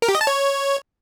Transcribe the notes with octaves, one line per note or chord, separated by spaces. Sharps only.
A#4
G4
D#5
A5
C#5